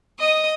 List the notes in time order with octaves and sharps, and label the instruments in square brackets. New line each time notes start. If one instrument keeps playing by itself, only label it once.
[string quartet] D#5 D#6